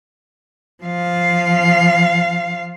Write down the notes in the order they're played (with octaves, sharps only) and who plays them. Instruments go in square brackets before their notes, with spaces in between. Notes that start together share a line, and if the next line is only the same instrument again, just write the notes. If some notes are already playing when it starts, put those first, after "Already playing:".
[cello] F3 F5